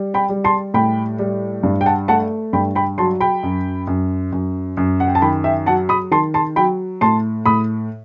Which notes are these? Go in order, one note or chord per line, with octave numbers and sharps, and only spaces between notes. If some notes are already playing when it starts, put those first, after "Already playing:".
Already playing: G3
G5 B5
G3
A5 C6
A2 G5 B5
G3
G2
G5
F#5 A5
A3 F#5 A5
G2 G5 B5
G5 B5
F#3 A5 C6
G5 B5
F#2
F#2
F#2
F#2
F#5
G5
A5
D#3 G5 B5
E5 G5
F#3 F#5 A5
B5 D#6
D#3 A5 C6
A5 C6
F#3 G5 B5
A2 A5 C6
A2 B5 D#6